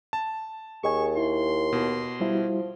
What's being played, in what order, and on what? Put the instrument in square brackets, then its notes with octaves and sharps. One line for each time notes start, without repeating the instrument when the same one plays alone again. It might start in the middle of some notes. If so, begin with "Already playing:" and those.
[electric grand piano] A5
[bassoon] D#2 [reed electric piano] G#4 D#5 G#5 [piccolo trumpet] C#6
[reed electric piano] E4 [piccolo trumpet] C6
[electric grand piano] B2
[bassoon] F3 [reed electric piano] G3 E4 F#4